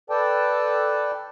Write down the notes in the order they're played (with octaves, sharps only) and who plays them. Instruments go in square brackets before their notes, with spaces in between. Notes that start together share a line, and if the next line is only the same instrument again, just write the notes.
[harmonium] A4 B4 D5 G5 A5